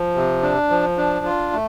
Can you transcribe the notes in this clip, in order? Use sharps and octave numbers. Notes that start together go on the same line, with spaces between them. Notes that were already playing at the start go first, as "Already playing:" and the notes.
Already playing: F3
C3
D4
F3
D4
F4
A3